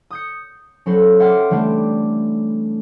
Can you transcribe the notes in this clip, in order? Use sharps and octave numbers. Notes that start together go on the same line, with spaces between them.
D#6 G6 C#7
F#3 C#4 A4 B4 C5
E5 F#5 G5 C6 D6 F6
E3 G3 A3 C4 D4